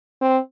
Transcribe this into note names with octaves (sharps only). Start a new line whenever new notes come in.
C4